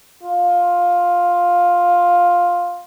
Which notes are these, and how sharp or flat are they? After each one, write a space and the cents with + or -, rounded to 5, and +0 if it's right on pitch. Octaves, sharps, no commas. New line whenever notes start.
F4 +10